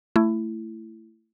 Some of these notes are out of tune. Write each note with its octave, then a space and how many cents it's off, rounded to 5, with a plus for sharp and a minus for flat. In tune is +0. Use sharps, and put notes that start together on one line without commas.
A3 +15 E4 +15